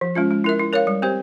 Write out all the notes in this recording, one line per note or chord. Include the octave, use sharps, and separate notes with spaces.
F3
G#3 C#4 F4
G#3
E4 A#4 E5
E4
A#4 C#5 F5
G3
C4 G4 C5